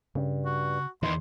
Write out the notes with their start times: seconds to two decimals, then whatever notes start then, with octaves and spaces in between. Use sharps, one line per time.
0.15 G2 C#3
0.45 F#4
1.03 E2 D#3 E3 C6